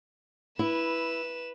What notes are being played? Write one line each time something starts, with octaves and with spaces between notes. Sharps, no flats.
E4 B4 E7